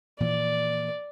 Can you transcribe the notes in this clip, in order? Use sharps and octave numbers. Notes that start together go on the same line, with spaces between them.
A#2 E3 F3 D5